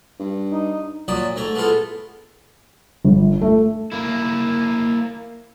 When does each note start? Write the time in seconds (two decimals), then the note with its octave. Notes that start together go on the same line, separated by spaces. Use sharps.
0.19 G2
0.50 D#4
1.08 A#2 F#3 D5 A5 D#6
1.36 G#2 A3 A#5
1.55 G#3 A3 B3 E4 F4 A4
3.04 G1
3.41 A3
3.92 A#3 E4